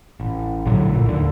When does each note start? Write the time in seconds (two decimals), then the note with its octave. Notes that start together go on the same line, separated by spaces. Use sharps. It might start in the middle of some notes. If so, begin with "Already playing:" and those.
0.20 A1
0.66 A#1 A2 D3 F#3
0.88 A#1 A#2 A3
1.06 D#2 D3